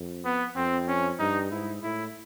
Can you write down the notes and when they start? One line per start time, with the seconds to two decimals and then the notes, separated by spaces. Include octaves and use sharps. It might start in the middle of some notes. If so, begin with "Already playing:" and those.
Already playing: F2
0.25 B3
0.56 F2 C4
0.88 C#4
1.19 G2 D#4
1.51 G#2 E4
1.83 A2 E4